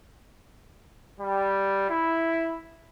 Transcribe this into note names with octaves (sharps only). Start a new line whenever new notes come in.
G3
E4